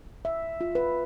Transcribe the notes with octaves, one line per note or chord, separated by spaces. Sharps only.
E5
F4
B4